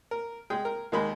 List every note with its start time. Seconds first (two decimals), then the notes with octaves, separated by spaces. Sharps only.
0.11 A#4
0.50 G#3 G#4 G5
0.65 A#4
0.92 D#2 D#3 G#3 A#3 B5